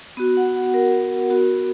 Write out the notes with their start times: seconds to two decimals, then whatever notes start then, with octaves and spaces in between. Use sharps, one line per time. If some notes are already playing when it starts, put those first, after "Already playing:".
0.17 B3 F#4
0.37 F#5
0.56 F#5
0.74 A#4
1.30 B3 F#4